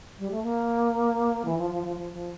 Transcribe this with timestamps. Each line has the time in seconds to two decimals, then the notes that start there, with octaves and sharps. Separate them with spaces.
0.18 G3
0.31 A3
0.43 A#3
1.45 E3
1.58 F3
1.70 F3
1.83 F3
1.96 F3
2.12 F3